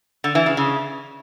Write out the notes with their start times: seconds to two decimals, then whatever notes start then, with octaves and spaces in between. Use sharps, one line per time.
0.24 D3
0.35 E3
0.46 C#3
0.57 C#3